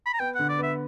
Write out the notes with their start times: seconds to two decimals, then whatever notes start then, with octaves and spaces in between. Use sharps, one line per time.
0.06 B5
0.13 A#5
0.20 B3 G5
0.35 D3 F#5
0.49 D5
0.59 B3 E5